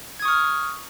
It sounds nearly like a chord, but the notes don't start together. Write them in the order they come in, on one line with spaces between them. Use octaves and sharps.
G#6 D#6 C#6 F6